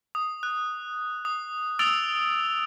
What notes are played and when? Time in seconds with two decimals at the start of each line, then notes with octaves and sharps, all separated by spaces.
0.15 D#6
0.43 F#6
1.25 D#6
1.79 D#6 E6 A6 D7 F7 G7